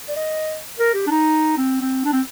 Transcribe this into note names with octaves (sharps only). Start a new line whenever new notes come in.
D5
D#5
A#4
G4
D4
D#4
C4
C4
D4
C4